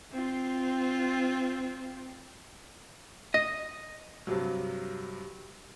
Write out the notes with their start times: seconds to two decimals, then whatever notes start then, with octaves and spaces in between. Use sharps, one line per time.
0.13 C4 F4
3.34 D#5
4.27 G2 C3 F#3